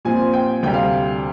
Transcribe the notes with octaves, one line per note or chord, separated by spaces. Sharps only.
A#2 F3 C4 G#5
G5
D2 C3 G3 G5
F5